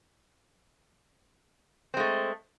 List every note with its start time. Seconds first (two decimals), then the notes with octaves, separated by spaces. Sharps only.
1.94 C4
1.97 G#3
2.00 A3